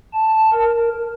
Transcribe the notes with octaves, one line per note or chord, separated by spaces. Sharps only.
A5
A#4